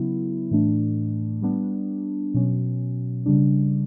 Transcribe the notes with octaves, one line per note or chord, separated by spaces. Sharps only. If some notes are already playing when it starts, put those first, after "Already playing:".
Already playing: C#3 F#3 B3 E4
A2 E3 A3 D4
G3 B3 D4
B2 F#3 C#4
C#3 G3 D4